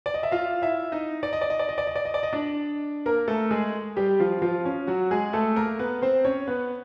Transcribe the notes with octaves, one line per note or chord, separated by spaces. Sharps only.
D5
D#5
E5
F4 F5
E4 E5
D#4 D#5
D5
D#5
D5
D#5
D5
D#5
D5
D#5
D5
D#5
D5
D#5
D4 D5
A#3 A#4
A3 A4
G#3 G#4
G3 G4
F3 F4
F3 F4
C#4
F#3 F#4
G#3 G#4
A3 A4
A#3 A#4
B3 B4
C4 C5
C#4 C#5
B3 B4